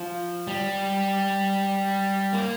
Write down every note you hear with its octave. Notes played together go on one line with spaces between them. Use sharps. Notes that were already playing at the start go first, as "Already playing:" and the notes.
Already playing: F3
G3
A#3